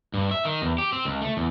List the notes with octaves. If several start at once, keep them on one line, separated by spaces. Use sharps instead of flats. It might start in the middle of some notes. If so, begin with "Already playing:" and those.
G2
E5
D#3
E2
G4
C4
C#2
A3
E2